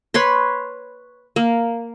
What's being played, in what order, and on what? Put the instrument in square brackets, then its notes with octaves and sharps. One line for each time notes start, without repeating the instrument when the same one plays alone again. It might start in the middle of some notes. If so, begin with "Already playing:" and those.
[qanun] B4 C#5 B5 C6
A#3